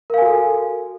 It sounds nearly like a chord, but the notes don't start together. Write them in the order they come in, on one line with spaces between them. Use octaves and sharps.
A#4 F5 G#5 F#4 A4